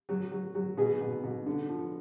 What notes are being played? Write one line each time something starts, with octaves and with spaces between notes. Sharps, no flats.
F#3
F#3
F#3
B2 G#4
B2
B2
D3
F3